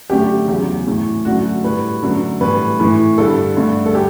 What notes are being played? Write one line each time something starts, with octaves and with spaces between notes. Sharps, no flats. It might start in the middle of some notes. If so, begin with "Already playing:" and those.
F#2 D3 A3 G4
E2 C#3 F#3
A2 E3 A3
F#2 D3 A3 F#4
A2 G3 B4
F#2 D3 F#3 A3
A2 E3 G3 B4
A2 E3 A3
G2 D3 G3 A4
G2 D3 A3
A4
G4